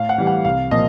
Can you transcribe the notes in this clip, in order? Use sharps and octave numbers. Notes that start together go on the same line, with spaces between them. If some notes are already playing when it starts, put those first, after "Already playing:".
Already playing: A2 F5
F#5
E3 G3
F#5
C2 F5
A#2 F3 D#5